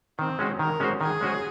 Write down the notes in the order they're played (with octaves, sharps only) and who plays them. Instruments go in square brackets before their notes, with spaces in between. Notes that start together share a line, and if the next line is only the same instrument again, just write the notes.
[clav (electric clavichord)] D#3 [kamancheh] C4
[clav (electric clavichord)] G#3 C#4 F#4 C5
[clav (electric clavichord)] D#3 [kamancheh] A#4
[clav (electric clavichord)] G#3 C#4 F#4 C5
[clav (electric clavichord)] D#3 [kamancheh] G#4
[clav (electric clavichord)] G#3 C#4 F#4 C5